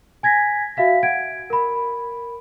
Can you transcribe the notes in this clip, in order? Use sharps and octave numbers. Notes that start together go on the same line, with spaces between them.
G#5 G#6 A#6 B6
F#4 E5 F5 B6
F#5 G#6 D7
A#4 B5